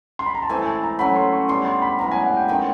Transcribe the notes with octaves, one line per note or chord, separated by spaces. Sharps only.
C6
B5
A#5
A5
E3 A3 C4 G#5
G#5
A5
A#5
F#3 A3 C#4 B5
C6
C#6
G3 B3 D4 G4 C6
C6
B5
A2 F#3 B3 A#5
G#5
F#5
G5
D#3 G#3 C#4 G5